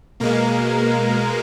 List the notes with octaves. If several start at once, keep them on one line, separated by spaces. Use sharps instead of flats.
B2 G#3 A#3 A#4